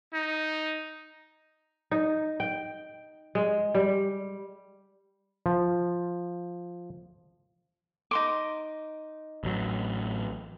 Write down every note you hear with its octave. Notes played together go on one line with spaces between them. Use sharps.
D#4
D#4
G5
G#3
G3
F3
D#4 C6 D6
A1 F#3